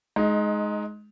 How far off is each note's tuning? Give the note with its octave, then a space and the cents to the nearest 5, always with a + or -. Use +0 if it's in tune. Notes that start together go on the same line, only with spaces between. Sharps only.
G#3 +20 D#4 +0